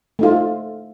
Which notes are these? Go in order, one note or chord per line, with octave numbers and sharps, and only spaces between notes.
A3 D#4 F4